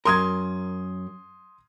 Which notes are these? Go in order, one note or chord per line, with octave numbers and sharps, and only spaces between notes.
F#2 A#4 C6 D#6 G#6